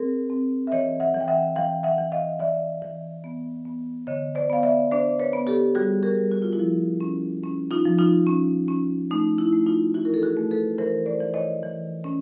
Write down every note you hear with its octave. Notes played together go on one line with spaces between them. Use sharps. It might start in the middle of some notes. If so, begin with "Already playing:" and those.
Already playing: C4 G#4 A#4
C4
E5
E3 C#5 D#5
E5 F#5
E3
G5
E5 F#5
E3 F5 G5
E5 F#5
E3
D#5 F5
E3 D5 E5
E3
B3
B3
D3 C#5 D#5
C5 D5
B3 F5
D5 E5
D4 C5 D5
B4 C#5
B3
G4 A4
G3 F#4 G#4
G#4 A#4
G3
F#4
F4
E4 F#4
F3
C#4
C#4
D#4 F4
F3
D#4 F4
C#4
C#4
A3 D#4
E4
A3
D#4 F4
E3 E4 F#4
A#4
A4
F#4 G#4
A3
A4 B4
E3 A#4 C5
C5 D5
E3
C#5 D#5
E3
C#4